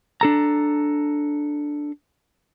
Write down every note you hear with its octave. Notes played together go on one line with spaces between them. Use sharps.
D4 A4 A#5